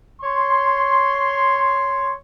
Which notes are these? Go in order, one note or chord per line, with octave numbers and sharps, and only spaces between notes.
C#5 C6